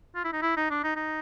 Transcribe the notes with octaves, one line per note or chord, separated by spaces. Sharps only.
F4
E4
D#4
E4
D#4
D4
D#4
D#4